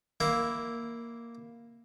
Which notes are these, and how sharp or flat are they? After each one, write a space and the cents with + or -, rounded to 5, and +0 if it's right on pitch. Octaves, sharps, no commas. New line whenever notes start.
A#3 +0 E4 +0